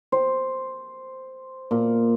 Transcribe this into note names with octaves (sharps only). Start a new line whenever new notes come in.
C5
A#2